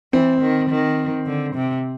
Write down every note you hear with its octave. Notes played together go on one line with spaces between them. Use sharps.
E3 C4
D#3
D#3
D3
C3